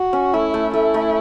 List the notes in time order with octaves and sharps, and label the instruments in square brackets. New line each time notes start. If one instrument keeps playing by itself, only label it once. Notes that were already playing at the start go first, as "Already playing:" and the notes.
Already playing: [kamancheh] F#4
[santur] C#4
[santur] A3 [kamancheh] E4
[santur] A3
[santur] A3 [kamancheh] E4
[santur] A3